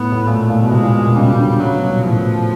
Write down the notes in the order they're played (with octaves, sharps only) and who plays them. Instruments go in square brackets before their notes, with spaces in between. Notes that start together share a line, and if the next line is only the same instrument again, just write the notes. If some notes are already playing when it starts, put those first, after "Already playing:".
Already playing: [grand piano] A2 [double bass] B3
[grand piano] A2
[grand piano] A#2 [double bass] A3
[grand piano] A#2
B2
[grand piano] C3 [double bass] G#3
[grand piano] A#2
B2
B2
[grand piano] C#3 [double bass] G3
[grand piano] D3
[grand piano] C#3 [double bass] F#3
[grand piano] B2
A#2
[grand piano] A2 [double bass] F3